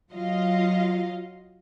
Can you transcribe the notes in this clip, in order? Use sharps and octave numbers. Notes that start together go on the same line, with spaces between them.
F#3 F4 D#5 F5